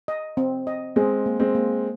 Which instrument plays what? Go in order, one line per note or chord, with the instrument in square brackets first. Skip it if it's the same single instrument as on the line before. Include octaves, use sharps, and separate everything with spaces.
[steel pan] D#5
C4
D#5
[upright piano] G#3 C4 [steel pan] G#4
[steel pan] A#3
[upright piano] G#3 C4
[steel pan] A#3